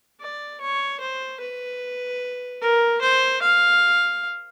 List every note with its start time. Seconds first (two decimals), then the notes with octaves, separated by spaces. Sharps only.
0.21 D5
0.61 C#5
1.00 C5
1.40 B4
2.62 A#4
3.01 C5
3.42 F5